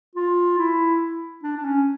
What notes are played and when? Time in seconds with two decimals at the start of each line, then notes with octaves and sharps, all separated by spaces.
0.15 F4
0.58 E4
1.43 D4
1.57 D4
1.65 C#4